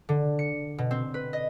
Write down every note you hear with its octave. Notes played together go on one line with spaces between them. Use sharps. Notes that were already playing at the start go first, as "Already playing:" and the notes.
D3
C#7
B2
C4
B4
D#5